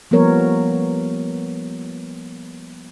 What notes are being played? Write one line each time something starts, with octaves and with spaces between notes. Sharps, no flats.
F3 G3 A#3 B3 A#4 C#5